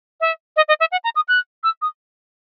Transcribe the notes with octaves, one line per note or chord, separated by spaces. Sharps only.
E5
D#5
D#5
E5
F#5
A#5
D#6
F#6
E6
D#6